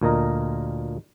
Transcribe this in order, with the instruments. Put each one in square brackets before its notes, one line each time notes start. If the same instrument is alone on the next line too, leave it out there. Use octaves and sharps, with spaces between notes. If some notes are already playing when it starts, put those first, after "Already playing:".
[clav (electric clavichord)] D2 A#2 A#4 D#5 A#5